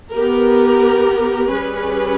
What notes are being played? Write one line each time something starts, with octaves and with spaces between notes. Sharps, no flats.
B3 G4 A#4
G3 C#4 G#4 B4